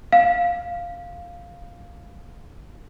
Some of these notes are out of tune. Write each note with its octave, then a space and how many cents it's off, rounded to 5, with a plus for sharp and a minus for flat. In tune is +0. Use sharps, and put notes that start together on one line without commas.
F5 +0